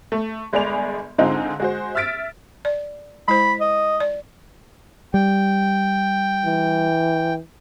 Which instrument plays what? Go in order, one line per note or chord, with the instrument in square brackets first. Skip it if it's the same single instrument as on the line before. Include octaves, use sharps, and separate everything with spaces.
[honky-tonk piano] A3
G1 G#3 G#4 D5 B5 F7
G#2 D3 G#3 C4 D#4 F4
G#3 F#4 C5
E5 E6 F6 A6 B6 D7
[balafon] D5
[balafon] G#3 E4 C5 [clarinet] B5
[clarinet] D#5
[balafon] D5
[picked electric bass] G3 [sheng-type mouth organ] G5
[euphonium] E3